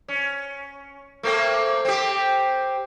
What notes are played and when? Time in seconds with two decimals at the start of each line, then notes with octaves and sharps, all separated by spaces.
0.08 C#4
1.23 A3 A#3 C4
1.85 C4 G4